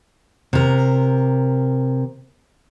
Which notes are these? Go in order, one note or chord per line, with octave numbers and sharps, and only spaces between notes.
C3 A#4